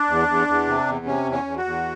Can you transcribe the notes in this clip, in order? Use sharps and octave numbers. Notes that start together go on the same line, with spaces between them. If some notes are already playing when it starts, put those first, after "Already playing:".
Already playing: D4
E2
E2
E2
C3
E2
C3 C#4
E2
C#4
E2
F#4
E2